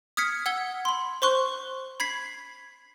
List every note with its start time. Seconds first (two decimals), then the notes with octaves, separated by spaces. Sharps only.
0.17 D#6 F6 G#6 B6 C#7
0.46 F#5 E6 G#6 G7
0.85 B5 C6
1.22 C5 C6 C#6 F#6
2.00 B5 G#6 B6 C7